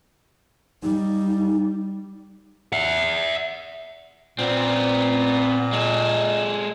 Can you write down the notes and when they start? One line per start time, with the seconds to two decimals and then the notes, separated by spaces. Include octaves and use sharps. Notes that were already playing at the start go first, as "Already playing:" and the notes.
0.83 G3 D#4
2.73 E5 F#5
4.39 A#2 B3 C4
5.73 G#3 A4